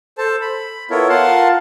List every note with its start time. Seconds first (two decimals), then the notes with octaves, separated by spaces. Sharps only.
0.18 A4 C5 A5
0.42 B5
0.90 B3 E4 F4 A4 A#4 C#5
1.09 F4 A#4 F5 F#5 A5 C6